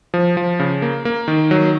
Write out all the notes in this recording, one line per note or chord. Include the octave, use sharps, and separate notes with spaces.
F3
F3
C#3
A#3
A#3
D#3
F#3